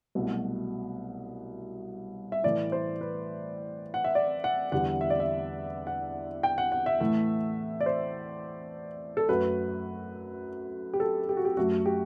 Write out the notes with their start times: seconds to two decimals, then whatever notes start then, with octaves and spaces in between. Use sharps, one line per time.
0.15 C2 B2 F#3 A3
2.32 E5
2.44 A2 E3 A3 D5
2.72 C5
3.01 B4
3.94 F#5
4.04 E5
4.15 D5
4.44 F#5
4.72 E2 D3 G3 F#5
5.01 E5
5.10 D5
5.20 E5
5.87 F#5
6.43 G5
6.58 F#5
6.72 F#5
6.86 E5
7.00 A2 E3 A3
7.81 D5
7.86 C5
9.17 A4
9.29 F#2 F#3 A3 B4
10.93 G4
11.00 A4
11.29 G4
11.37 F#4
11.45 G4
11.57 F#2 F#3 A3 F#4
11.86 G4